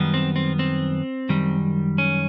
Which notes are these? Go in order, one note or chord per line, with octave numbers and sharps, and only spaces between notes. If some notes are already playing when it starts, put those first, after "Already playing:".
Already playing: F#2 D#3 G3 B3
C4
C4
C4
F#2 D#3 G3
C#4